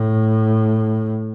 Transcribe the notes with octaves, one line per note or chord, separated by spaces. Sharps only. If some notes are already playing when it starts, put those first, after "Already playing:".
Already playing: A2